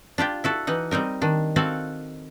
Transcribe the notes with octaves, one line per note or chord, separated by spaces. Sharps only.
D4 F4 G4 G5
E4 F#4 A4
E3 D#4 F#5
G3 C4 D#4 A#4
D#3 D4
C4 F#4 A4 F5 F#5